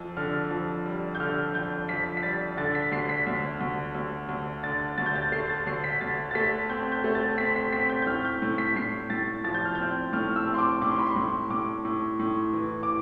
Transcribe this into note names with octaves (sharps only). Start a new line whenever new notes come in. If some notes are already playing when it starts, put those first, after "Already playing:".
Already playing: F2
D3 F6
F2
G3
G6
D3 F6
F2 G6
F2 B6
B6
G3 A6
D3 A6
B6
D2 C7
B6
D2
D2
D2
D2
D3 A6
D2 A6
G6
A6
A3 C7
A6
D2 C7
B6
D2 A6
A6
A3 B6
C4 G6
G6
A3
A6
C4 B6
B6
C4 B6
G6
G6
A2 F6
G6
A2
B6
A2 C7
A2 A6
F3 A6
G6
F6
C4 G6
A2 F6
E6
C4
C6
D6
A2 D6
C6
B5
C6
A2
A2 D6
A2
A2
E3
D6